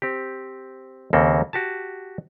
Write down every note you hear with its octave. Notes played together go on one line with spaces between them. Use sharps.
C4 G4
D#2 C#3 A#3 C4 A4
F#4 G4 A5